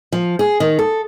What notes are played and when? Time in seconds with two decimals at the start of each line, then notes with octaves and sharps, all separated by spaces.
0.12 F3
0.39 G#4
0.60 D#3
0.79 A4